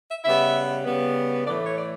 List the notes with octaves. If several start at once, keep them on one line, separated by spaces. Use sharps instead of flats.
E5
C#3 G3 B3 E5
C#3 G3 B3
A2 E3 A3 D5
C#5
D5